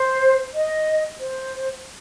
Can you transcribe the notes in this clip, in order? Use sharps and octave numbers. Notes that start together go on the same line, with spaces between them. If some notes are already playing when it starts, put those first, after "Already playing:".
Already playing: C5
D#5
C5